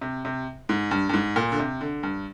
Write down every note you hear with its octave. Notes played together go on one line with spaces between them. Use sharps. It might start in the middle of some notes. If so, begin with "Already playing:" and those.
C3
C3
G#2
G2
G2
G#2
A#2
D3
C3
D3
G2